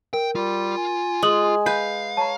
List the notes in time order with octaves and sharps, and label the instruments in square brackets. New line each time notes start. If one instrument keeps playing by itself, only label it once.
[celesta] A#4 [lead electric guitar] G5
[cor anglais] G3 [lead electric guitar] F4
[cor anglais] G#5
[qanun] G#3 [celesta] G#4 D#6 F#7
[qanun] B4 [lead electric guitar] F5 [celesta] G6
[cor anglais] C#5 [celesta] A5 A#5